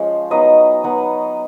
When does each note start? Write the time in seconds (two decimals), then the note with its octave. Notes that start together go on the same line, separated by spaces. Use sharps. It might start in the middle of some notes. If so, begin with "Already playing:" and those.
Already playing: F3 G#3 C#4
0.31 F#3 B3 D#4 D#5
0.84 F#3 B3 D#4